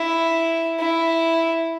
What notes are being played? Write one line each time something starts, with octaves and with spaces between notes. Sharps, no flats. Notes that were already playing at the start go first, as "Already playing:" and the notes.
Already playing: E4
E4